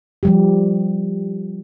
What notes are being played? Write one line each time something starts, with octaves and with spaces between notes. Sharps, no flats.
F3 G3 G4